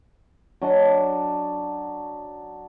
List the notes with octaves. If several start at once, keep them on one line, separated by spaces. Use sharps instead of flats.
F#3 D4 D#5 A5